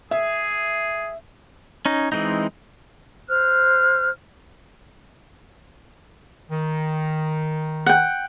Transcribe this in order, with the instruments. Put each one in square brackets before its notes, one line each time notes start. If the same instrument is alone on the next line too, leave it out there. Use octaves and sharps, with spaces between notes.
[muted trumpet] G#4 [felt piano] E5
[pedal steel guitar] C#4 D#4
E3 G#3 C4 D#4
[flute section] C5 F6 F#6
[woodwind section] D#3
[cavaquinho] F#5 G5